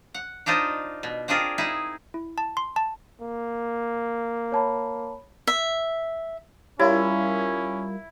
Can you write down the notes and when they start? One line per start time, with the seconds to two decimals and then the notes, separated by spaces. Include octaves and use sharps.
0.14 F#5
0.46 D4 D#4 F4 C5 D#5
1.03 B2
1.28 C4 D4 F4 G#4 A#4
1.58 D#4 E4 G#4
2.14 E4
2.38 A5
2.57 C6
2.76 A5
3.21 A#3
4.52 C#5 A5 B5
5.47 E5
6.79 G3 C#4 E4 F4 A#4 C#5